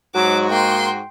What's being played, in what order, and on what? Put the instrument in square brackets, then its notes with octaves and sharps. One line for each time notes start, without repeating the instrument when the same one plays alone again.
[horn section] G#2 F#4 [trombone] F#3 [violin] D6
[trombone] A#3 [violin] G5 C6